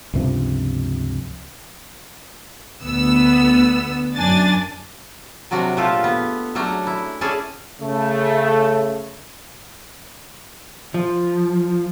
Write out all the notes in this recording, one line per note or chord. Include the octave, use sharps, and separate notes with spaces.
C#2 G2 C3 F3
D2 B3 E6
F#2 D4 G#5 A6
C3 F#3 D4 F#4 A#4
A#2 F3 A3 F4 G4 A4
B3
F#3 A3 C#4 D4 A#5
E4
C#4 E4 G#4 A4 D5
C#3 A3
F3